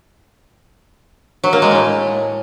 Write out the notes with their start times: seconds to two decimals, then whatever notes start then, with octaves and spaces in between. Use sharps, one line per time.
1.44 F#3
1.53 A#3
1.62 G#3
1.71 A2